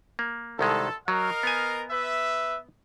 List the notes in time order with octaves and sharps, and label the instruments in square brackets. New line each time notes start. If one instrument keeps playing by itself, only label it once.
[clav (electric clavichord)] A#3
[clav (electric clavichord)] C2 D#3 G#3 [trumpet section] A4
[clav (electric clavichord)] F#3 [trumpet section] A#4 D#5 F5
[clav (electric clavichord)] B3 G#5
[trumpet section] B4 E5